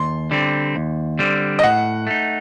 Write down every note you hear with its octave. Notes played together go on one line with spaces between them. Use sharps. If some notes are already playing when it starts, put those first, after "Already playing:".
Already playing: D#2 C6
D3 G3 C4
D#2
D3 G3 C4
D#5
A2 F#5
A3 D#4